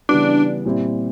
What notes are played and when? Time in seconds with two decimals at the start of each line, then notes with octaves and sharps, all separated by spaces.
0.09 C#3 E3 G3 B3 D4
0.65 A#2 G3 C4 E4 G4